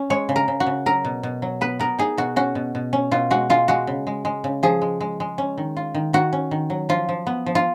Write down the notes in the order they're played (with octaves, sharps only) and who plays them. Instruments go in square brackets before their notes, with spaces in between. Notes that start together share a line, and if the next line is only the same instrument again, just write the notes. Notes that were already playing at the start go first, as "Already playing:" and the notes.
Already playing: [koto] C#4
G#3 C#5
C#3
A#4
C#3
F#4
C#3
F#3 A#4
B2
B2
F#3
B3 B4
B3 A#4
D#4 G#4
B2 F#4
C#4 F#4
B2
B2
C#4
B2 F4
G#3 F#4
G#3 F4
G#3 F#4
C#3
G#3
G#3
C#3
F3 G#4
G#3
G#3
G#3
C#4
D#3
F4
D#3
D#3 F#4
C#4
D#3
F#3
F3 F4
F3
B3
F3
F4